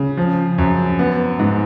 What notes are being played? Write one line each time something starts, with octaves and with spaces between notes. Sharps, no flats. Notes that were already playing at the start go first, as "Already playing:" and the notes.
Already playing: C#3
F3
F#2
B3
G#2